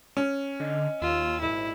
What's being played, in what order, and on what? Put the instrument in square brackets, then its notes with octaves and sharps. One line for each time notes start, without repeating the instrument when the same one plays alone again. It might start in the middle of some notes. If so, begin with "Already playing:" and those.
[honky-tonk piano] C#4
[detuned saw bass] D3 [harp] D#5
[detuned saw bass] D#2 [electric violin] F4 E6
[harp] G#1 A#2 D5 [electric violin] E4